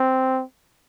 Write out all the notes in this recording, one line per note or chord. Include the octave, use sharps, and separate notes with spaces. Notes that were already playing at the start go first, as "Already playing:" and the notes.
Already playing: C4